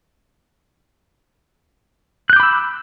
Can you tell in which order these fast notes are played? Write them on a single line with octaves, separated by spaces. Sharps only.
F#6 G6 D6 B5 E6